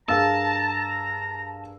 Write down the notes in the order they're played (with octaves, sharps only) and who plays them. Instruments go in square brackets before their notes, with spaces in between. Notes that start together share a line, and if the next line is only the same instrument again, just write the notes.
[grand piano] G2 G#4 A#4 [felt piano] F5 E6 [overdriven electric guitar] A5 [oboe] A#5